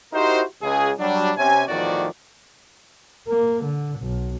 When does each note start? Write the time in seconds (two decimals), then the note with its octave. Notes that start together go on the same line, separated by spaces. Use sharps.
0.13 D#4 E4 F#4 G4 A#4 C5
0.62 C#2 G#4
0.99 F#3 G3 D4
1.37 C3 C#4 G#5
1.68 E2 A2 D#3 F3 F#4 D5
3.28 A#3
3.65 D3
4.00 B1